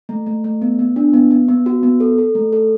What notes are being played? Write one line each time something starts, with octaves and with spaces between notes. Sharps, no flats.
A3
A3
A3
B3
B3
D4
B3
B3
B3
F#4
B3
A4
A4
A3
A4